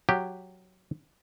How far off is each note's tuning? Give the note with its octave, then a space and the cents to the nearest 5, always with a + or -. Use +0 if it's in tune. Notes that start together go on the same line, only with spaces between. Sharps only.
F#3 +0 G4 +0